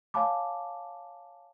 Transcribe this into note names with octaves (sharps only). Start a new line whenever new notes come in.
C#5 F5 G#5 A5 B5 D6